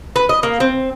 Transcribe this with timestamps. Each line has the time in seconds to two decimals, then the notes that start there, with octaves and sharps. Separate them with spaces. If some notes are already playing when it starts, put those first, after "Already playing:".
0.16 B4
0.29 D#5
0.43 A#3
0.60 C4